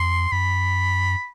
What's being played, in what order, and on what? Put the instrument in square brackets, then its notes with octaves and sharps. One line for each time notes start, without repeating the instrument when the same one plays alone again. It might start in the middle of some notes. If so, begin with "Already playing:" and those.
Already playing: [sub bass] F2 [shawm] C6
[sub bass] F#2 [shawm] B5